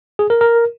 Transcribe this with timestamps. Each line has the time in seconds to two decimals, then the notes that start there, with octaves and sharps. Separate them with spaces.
0.19 G#4
0.30 A#4
0.41 A#4